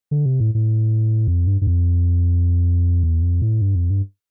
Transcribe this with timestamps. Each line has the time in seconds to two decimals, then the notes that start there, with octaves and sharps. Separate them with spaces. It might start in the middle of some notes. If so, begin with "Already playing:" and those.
0.11 D3
0.26 C3
0.40 A2
0.55 A2
1.28 F2
1.47 G2
1.61 G2
1.67 F2
3.03 E2
3.22 F2
3.42 A2
3.62 G2
3.75 F2
3.90 G2